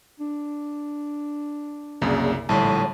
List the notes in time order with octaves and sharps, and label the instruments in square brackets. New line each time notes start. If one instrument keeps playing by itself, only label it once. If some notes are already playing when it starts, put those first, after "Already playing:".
[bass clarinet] D4
[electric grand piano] C2 F#2 C#3 [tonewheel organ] A#3 G#4 D5
[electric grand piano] A#1 A2 [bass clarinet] D3 [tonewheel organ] G3 C#5 [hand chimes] A5